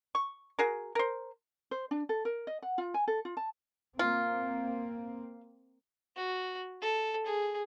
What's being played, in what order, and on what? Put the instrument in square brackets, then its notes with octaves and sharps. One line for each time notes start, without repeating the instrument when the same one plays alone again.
[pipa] C#6
F#4 G#4 A#4
A#4 C5
[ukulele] C5
D4
A4
A#4
D#5
F#5
F4
G#5
A4
F4
A5
[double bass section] A#3 C4 [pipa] F4
[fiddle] F#4
A4
G#4